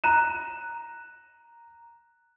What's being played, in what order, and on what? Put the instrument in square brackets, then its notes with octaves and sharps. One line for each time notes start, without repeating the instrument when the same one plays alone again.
[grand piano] A#5 F#6 E7